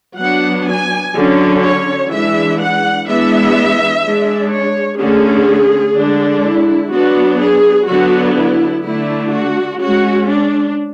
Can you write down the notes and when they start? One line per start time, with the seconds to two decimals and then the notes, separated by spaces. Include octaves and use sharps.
0.19 F#3 B3 D4 F#5
0.66 G#5
1.15 D3 F#3 C#4
1.63 C#5
2.11 E3 G#3 D4 E5
2.60 F#5
3.08 E3 G#3 B3 D4 E5
4.04 G#3 D4
4.52 C#5
5.00 D3 A3 C#4 G#4
5.96 D3 G#3 D4
6.45 E4
6.92 F#3 B3 D4 F#4
7.41 G#4
7.89 D3 F#3 B3 D4 F#4
8.37 E4
8.85 D3 A3 D4 E4
9.33 F#4
9.81 G#3 C#4 F#4
10.29 D4